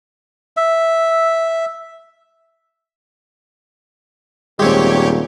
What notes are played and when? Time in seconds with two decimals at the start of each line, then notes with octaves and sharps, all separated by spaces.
0.57 E5
4.59 D#1 G#3 C4 G4 C#5